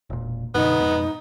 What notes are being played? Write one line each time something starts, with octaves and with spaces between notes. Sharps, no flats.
E1 A#2
F#2 B2 D3 B3 D#4
F2 G#2 B2